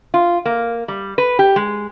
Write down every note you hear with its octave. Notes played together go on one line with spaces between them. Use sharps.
F4
A#3
G3
B4
G4
G#3